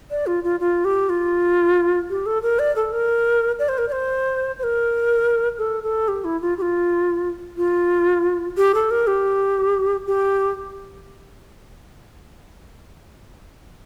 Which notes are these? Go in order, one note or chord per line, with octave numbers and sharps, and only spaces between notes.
D5
F4
F4
F4
G4
F4
G4
A4
A#4
D5
A4
A#4
D5
C5
A#4
D5
C5
C5
A#4
A4
A4
G4
E4
F4
G4
F4
F4
G4
A4
A#4
G4
G4